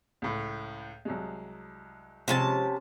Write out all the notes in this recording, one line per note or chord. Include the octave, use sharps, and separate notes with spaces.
C#2 A2
C2 F#3 G#3
C3 F3 G#3 C4 C#4 A5